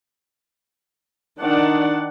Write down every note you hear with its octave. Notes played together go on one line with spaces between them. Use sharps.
D#3 D4 D5 F#5